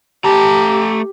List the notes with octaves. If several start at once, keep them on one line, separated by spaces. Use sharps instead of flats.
A3 G4 A5 A#5